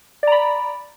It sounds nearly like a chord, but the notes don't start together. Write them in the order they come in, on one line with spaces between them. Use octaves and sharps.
D5 A#5 B5